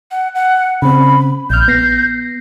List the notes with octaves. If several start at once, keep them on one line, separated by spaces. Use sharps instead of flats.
F#5
F#5
C#3 C4 B5
A#1 F6 G6
B3 A#6 C7